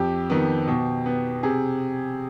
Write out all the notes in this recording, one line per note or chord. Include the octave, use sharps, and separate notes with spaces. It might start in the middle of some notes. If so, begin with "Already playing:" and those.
Already playing: F2 G4
D#3 B3
B2
B3
C3 G#4